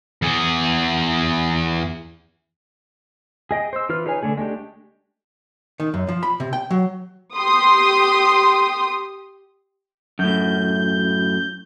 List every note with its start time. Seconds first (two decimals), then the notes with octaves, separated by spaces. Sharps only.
0.22 E2 G#4
3.51 G#4 D#5 G5
3.73 C5 E6
3.89 E3 F4 B4 F6
4.06 D#4 G#4 B4 C#5 G#5
4.23 D3 A3 G#4
4.38 G#3 A3 D4 G4
5.80 D#3
5.94 F#2
6.09 F3
6.23 B5
6.40 C3
6.53 G5
6.71 F#3
7.36 G4 C6 D#6
10.19 F#2 A2 G6